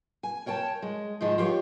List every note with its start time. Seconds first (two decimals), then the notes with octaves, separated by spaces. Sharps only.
0.23 G#5
0.46 A#4 C#5 G5 A5
0.82 G#3
1.21 G#2 D#3 F3 G#3
1.38 F4 G4 C5 C#5 F5